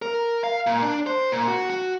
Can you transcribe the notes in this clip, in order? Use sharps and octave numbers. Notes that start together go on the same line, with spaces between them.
A#4
F5
A#2
D4
C5
A#2
F#4
F#4